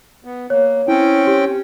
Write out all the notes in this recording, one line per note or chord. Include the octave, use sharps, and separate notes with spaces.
B3
A#3 C#5
C4 C#4 E4 G5
G4